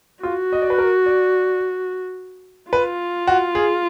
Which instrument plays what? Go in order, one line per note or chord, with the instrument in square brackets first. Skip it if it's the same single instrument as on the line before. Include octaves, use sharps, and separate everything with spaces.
[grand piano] F4 [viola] F#4
[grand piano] D#5
D5
B4
A#4
D5
[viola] F4 [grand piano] B4
[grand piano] F#4
G#4